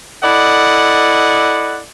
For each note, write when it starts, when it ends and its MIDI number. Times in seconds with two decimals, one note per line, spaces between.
0.24 1.80 64
0.24 1.80 69
0.24 1.80 74
0.24 1.80 75
0.24 1.80 78